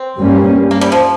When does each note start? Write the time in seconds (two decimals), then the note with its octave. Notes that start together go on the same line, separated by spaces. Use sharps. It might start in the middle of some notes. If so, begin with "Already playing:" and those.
Already playing: C4
0.19 G2 G3 A#3 C#4
0.71 A#3
0.81 G3
0.92 F3